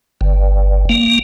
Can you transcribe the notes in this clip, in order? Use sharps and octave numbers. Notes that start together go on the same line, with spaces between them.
G1
A#3